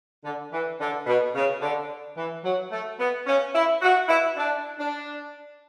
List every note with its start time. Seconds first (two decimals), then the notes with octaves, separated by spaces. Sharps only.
0.24 D3
0.52 E3
0.80 D3
1.06 B2
1.35 C#3
1.62 D3
2.17 E3
2.44 F#3
2.71 A3
2.99 B3
3.26 C#4
3.54 E4
3.81 F#4
4.08 E4
4.36 D4
4.78 D4